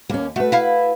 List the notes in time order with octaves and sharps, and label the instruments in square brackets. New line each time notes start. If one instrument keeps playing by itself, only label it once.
[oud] D#2 [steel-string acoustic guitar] A#3 C#4
[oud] A3 [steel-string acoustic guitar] F#4 B4
[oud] E4 F5